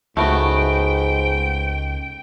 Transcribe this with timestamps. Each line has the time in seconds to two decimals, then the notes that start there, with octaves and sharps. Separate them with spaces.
0.17 C#2 G#2 A3 B3 F#4 G5